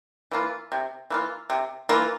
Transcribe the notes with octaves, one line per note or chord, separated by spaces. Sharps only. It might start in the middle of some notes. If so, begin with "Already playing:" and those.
E3 A#3 F4
C3
E3 A#3 F4
C3
E3 A#3 F4